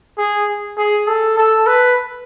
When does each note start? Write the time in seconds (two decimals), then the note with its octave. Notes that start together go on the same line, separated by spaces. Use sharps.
0.18 G#4
0.78 G#4
1.08 A4
1.38 A4
1.67 B4